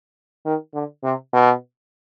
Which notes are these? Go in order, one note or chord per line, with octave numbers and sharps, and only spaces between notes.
D#3
D3
C3
B2